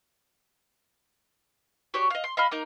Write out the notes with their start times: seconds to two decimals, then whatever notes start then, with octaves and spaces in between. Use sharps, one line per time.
1.94 F#4 G4 C#5 D5
2.10 D#5 F5
2.24 C6
2.37 D#5 F5 B5 F6
2.51 A#3 D#4 A#4